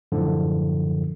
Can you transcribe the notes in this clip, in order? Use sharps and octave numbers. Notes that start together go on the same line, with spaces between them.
F#2 A2 D3 F3